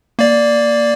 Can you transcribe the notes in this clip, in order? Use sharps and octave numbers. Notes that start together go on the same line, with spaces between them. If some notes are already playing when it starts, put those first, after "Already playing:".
A#3 D5